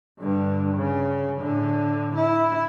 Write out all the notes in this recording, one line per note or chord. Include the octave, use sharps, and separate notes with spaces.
G2 D3
C#3
A2 D3
E4